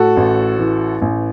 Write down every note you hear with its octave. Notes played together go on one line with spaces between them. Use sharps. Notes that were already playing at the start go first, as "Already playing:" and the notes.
Already playing: A2 F#4 A4
A1
E3
A1